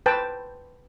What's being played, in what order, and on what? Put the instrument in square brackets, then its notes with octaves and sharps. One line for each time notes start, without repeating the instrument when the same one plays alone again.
[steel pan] B4 C5 G5 A5